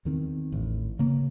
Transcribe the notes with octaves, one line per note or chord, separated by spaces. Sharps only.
E2 D#3 C4
A1
C#3 A#3